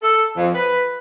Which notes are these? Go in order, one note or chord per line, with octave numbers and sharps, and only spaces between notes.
A4
F2
B4